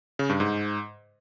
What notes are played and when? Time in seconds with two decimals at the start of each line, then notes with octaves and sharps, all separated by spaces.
0.19 C#3
0.30 G2
0.40 G#2